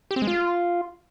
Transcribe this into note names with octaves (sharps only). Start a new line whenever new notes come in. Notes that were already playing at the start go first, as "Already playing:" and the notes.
G4
C4
G#3
F4